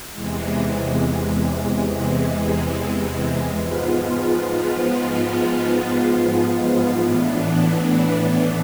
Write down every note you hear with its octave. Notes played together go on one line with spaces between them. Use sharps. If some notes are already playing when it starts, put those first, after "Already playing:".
E2 C3 E3 G#3
G#2 F3 G#3 B3 F4
A2 E3 B3 D4